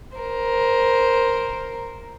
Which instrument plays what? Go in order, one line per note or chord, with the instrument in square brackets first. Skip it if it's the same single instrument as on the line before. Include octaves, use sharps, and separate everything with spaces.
[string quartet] A#4 C5